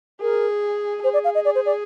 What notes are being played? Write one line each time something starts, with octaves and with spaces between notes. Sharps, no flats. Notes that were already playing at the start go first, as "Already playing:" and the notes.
G#4 A#4
G#4 C5
D5
F5
D#5
D5
C5
D5